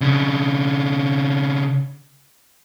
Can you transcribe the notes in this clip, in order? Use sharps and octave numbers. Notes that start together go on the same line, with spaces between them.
C#3 D4